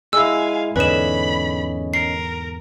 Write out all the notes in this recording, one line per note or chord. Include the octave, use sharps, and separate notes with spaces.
G#3 E4 F5 G#5 E6
E2 G#2 D3 C#4 B4 D#5 B5 E7
A#4 C7